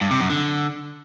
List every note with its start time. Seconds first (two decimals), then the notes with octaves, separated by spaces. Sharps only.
0.01 G2
0.11 C3
0.20 F#2
0.30 D3